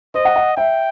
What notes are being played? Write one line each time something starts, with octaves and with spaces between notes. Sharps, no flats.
C5 D#5
F#5
F#5
E5 G5